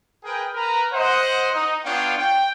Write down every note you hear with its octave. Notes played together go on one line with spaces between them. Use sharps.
G#4 A#4 B4 G5
A#4 B4 A#5
C5 D#5 F#5
D#4
B3 D4 F4 C#5 F5 G5
G5